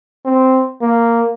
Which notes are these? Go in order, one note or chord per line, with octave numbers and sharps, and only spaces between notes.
C4
A#3